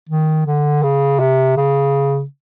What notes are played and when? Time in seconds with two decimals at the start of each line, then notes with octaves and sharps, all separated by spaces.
0.09 D#3
0.47 D3
0.83 C#3
1.20 C3
1.57 C#3